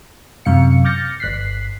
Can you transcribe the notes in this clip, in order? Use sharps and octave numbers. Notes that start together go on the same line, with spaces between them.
F#2 C3 F5 C#7
D6 F6 G6 A6 A#6 C#7
G1 F#6 B6 C7